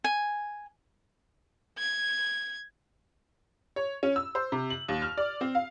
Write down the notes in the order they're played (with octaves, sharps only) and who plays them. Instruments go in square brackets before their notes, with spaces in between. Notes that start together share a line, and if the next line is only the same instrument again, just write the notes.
[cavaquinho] G#5
[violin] G#6
[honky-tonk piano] C#5
C#4
E6
C5
C3
F#7
D#2
F6
D5
C4
F5